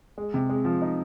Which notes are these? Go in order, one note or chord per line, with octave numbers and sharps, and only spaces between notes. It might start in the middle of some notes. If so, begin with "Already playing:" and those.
G#3
C3
G#3
F3
D#4